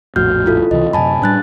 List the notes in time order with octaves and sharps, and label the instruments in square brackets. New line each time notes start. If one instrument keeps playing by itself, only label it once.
[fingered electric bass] A#1 F2 A2 [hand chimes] F#4 F6 G6
[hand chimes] E4 F4 A4
[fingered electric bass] C#2 C3 E3 [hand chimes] D#5
[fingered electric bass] F#2 C3 [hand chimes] G#5 A5 B5
[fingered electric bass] A2 G3 [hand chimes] D4 F#6 A6